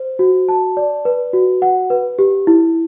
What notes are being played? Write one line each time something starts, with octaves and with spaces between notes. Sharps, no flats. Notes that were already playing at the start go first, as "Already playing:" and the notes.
Already playing: C5
F#4
A5
D5
B4
F#4
F#5
B4
G4
E4